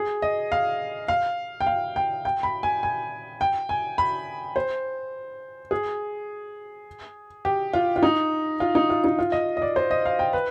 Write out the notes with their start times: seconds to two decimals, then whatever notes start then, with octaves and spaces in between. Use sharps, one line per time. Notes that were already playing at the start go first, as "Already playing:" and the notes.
Already playing: G#4
0.22 D#5
0.52 F5
1.08 F5
1.61 G5
1.67 F5
1.96 G5
2.25 G5
2.43 B5
2.63 G#5
2.83 G#5
3.41 G5
3.69 G#5
3.98 B5
4.56 C5
5.71 G#4
7.45 G4
7.73 F4
7.96 F4
8.03 D#4
8.60 F4
8.75 D#4
8.90 F4
9.04 D#4
9.19 F4
9.32 D#5
9.57 D#5
9.62 D5
9.76 C5
9.91 D#5
10.05 F5
10.19 G5
10.33 B4